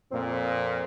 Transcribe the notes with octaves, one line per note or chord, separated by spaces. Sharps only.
F2 A#2 C4